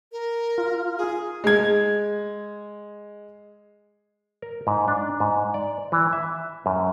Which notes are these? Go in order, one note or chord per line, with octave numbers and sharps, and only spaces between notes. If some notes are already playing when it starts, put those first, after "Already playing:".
A#4
F4
G#4
G#3 G#6
A#4
G#2
D4
G#2
D5
E3
E5
F#2